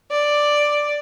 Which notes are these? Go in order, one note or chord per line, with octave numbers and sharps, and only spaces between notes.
D5